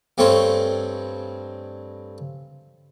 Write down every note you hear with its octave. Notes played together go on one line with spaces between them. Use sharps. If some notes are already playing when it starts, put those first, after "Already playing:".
G2 A3 C4 C#4 C5